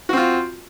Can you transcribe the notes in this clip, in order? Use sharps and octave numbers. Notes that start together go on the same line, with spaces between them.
C4 F4 F#4